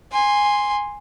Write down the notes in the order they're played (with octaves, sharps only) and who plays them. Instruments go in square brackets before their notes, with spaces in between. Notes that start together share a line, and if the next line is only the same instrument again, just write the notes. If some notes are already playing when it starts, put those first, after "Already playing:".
[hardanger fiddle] G#5 C6